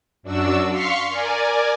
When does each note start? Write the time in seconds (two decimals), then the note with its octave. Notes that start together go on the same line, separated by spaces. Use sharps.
0.23 F#2 D4 F#4 E6
0.70 F5 C6 C#6 F6 B6 C#7
1.09 A#4 D5 G#5